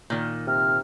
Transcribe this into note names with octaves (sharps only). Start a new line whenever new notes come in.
A#2 D#3
C3 C5 F6